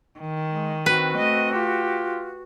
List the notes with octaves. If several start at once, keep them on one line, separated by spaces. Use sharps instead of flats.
D#3
G#3
C4 F#4 B4
A3 D#5
F4 G4